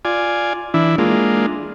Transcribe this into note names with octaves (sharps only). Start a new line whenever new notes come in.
F4 D5 G#5
E3 D4 E4
G#3 A#3 D4 F4